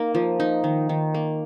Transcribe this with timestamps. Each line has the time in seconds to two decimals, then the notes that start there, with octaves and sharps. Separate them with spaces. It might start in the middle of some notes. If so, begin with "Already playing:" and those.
Already playing: A#3 D#4 A#4
0.15 F3
0.40 D#4
0.64 D#3
0.89 D#3
1.14 A#3